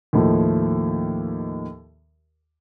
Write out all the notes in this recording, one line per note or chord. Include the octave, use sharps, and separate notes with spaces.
D#2 A2 D#3 F3